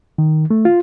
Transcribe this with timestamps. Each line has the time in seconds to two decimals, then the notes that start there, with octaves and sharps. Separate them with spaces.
0.18 D#3
0.51 A3
0.65 F4